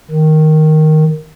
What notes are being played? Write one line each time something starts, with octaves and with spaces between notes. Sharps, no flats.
D#3